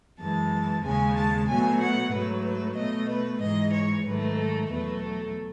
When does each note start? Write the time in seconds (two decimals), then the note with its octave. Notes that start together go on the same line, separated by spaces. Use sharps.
0.20 F#2 E3 G#3 A5
0.84 D#2 C#3 G#3 G#5
1.17 A5
1.48 B2 F#3 A3 G#5
1.81 F#5
2.13 G#2 F#3 A3 B4
2.45 B4
2.77 B2 A3 D#5
3.10 B4
3.42 G#2 E3 G#3 D#5
3.74 C#5
4.06 G#2 D#3 F#3 A3 B4
4.38 A4
4.70 E2 B2 F#3 A3 B4
5.02 A4